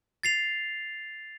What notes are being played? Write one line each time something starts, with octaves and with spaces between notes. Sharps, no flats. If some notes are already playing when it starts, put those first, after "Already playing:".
A6 C7 F7